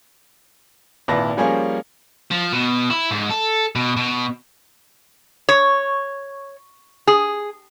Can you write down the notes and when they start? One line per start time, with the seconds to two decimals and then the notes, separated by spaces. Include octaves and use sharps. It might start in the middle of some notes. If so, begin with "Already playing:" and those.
1.08 G#1 A#2 E4 B4 A5 A#6
1.37 F3 G3 A#3 C#4 F4 G#4
2.31 F3
2.52 B2
2.90 E4
3.11 G#2
3.31 A4
3.75 B2
3.96 B2
5.49 C#5
7.07 G#4